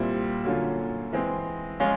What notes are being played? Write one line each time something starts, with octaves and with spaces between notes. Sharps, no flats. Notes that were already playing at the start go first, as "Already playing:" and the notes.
Already playing: A#2 G3 C4 E4
D3 F#3 A#3 C#4 F4
E3 G#3 C4
F3 G#3 C#4 F4